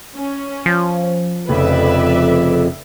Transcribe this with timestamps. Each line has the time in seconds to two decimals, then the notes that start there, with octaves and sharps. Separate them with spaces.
0.15 C#4
0.66 F3
1.49 F1 F2 C#3 B4 D5 E5